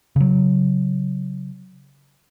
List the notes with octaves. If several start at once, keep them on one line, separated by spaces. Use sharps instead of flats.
C#3 F#3